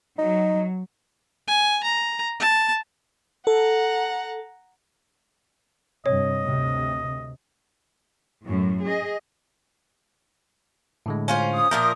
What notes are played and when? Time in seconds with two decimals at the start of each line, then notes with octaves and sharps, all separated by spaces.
0.19 F#3 D#4
1.48 G#5
1.83 A#5
2.40 A5
3.47 A4 F#5 A#5
6.06 G2 C3 C#5 D#5
6.43 D2 C3
8.44 F#2 A2
8.85 G#4 D#5
11.06 A2 D3 G#3
11.28 C#4 F4 C5
11.54 D#6
11.71 A#2 F3 A#4 E5 G6